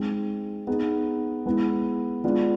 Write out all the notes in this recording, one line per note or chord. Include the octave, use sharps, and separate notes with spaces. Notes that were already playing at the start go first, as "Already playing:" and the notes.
Already playing: G#3 C4 D#4
B3 D#4 G#4
G#3 B3 E4
G#3 B3 D4 F4